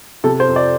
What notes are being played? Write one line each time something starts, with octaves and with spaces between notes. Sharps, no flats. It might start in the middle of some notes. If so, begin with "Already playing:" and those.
C3 A4
C5
F2
D5